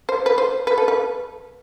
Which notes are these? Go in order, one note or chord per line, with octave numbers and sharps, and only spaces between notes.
C5
B4
C5
B4
A4
B4